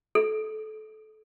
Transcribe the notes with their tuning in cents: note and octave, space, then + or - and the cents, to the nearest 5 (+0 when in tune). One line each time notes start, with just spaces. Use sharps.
A4 -25